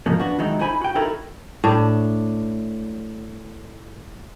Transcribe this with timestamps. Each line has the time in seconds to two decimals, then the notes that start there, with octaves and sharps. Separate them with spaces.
0.06 G#2 C#3 F3 F#3 A#3
0.20 B3 D4 F#4
0.39 D#3 F#3 G#3 D#4 E4
0.59 D#4 E4 C5 G#5 B5
0.81 F#4 G5
0.95 D#4 E4 F#4 A4 A#4 E5
1.64 A2 D4